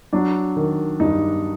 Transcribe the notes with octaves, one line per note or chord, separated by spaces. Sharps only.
F#3 D4
D#3
G2 D#4